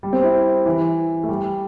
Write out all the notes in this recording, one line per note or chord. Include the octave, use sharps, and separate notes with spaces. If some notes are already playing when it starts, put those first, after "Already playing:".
G3
C4
E4
E3
A3
G3